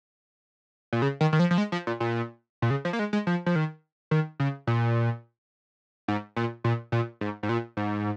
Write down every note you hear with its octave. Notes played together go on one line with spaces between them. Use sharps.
A#2
C#3
D#3
D#3
F3
F3
G#3
F3
A#2
A#2
A#2
C#3
F3
A#3
G#3
G#3
F3
F3
D#3
D#3
C#3
A#2
G#2
A#2
A#2
A#2
G#2
G#2
A#2
G#2